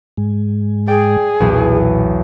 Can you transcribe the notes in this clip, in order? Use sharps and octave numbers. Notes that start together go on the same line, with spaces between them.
G#2 G#3
G#4 D5 G5
B1 E2 A#2